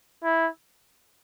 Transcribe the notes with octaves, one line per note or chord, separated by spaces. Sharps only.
E4